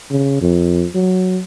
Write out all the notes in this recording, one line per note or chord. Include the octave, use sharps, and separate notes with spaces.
C#3
F2
F#3